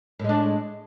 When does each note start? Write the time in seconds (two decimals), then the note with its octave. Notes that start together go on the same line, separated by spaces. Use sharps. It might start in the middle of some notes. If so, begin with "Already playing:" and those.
0.19 A2
0.24 G#3
0.29 D4